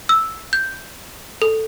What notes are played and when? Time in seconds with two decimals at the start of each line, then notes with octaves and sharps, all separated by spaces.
0.09 E6
0.53 G6
1.42 A4